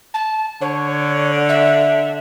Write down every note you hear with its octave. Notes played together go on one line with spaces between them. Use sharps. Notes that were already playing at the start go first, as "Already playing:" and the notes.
A5
D3 C#5
E5